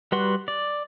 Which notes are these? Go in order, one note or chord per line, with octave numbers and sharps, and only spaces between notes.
G3 F#4 B4 F#5 C6
D5